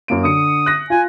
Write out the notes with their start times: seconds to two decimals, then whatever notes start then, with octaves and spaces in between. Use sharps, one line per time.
0.08 F#2 A#3 D7
0.24 D3 D#6 C#7
0.66 F#6 A#6
0.90 F4 G#5